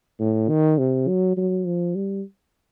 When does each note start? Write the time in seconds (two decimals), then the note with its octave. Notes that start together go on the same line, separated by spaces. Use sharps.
0.20 A2
0.49 D#3
0.78 C3
1.08 F#3
1.37 F#3
1.65 F3
1.95 G3